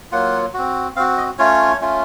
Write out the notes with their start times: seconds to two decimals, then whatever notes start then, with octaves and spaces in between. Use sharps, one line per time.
0.11 F#3 A#3 F4 F#5
0.54 C4 F#4
0.96 C4 F5
1.00 F#4
1.17 D#5
1.38 A3 C#4 F4 C#5
1.81 A3 C#4 F4